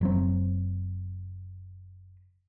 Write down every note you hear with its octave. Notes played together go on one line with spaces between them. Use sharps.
F#1 F#3 C4